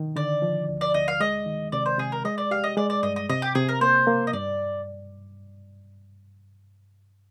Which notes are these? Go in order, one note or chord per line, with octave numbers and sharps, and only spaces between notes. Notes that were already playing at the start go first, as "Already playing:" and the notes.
Already playing: D#3
D3 D5
F3
D2
D5
D2 D#5
F5
G#3 D#5
D#3
C3 D5
C5
C3 G#4
A#4
G#3 D#5
D5
G4 F5
D#5
G#3 D5
D5
G2 D#5
D#5
C3 D#5
G4
C3 G#4
A#4
A#3 C5
A#3
D#5
G2 D5